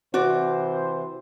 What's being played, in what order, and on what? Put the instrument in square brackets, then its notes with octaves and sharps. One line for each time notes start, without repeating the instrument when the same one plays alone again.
[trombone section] C3 E3 C5 [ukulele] F#4 D5